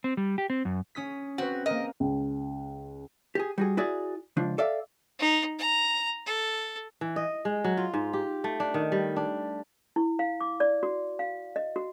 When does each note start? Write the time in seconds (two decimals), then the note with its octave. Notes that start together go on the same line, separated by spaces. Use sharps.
0.04 C4
0.17 G3
0.38 G4
0.50 C4
0.65 F#2
0.95 C#4 D#6 B6
1.38 C4 F#4 B4
1.66 A#3 A#4 D#5
2.00 C#2
3.35 G4 G#4
3.58 G3 F#4 G#4
3.77 E4 F#4 G#4 D5
4.37 C#2 F3 D4
4.58 A4 D5 E5 F5
5.19 D#4
5.59 A#5
6.26 A4
7.01 E3
7.16 D#5
7.45 G#3
7.64 F#3
7.77 F4
7.94 G#2
8.13 G4
8.44 A3
8.60 D4
8.74 D#3
8.92 G3
9.16 D4
9.96 E4
10.19 F5
10.41 D6
10.60 D5
10.83 F#4
11.19 F5
11.56 D#5
11.76 F#4